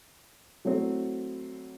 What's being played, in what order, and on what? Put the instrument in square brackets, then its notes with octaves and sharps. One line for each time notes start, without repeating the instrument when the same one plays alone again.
[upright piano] F#3 A3 C4 E4